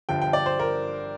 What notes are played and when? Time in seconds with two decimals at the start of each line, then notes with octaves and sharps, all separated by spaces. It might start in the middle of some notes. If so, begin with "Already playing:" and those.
0.09 G1 G2 D3 F3 G5
0.22 G5
0.33 D5
0.46 C5
0.60 A#4